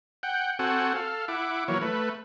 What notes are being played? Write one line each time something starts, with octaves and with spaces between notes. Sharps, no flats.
F#5 G5
C4 F#4 A4 F#5 G#5
A4 F5
E4 F#5 D6
E3 F#3 A#3 C#5
A3 B4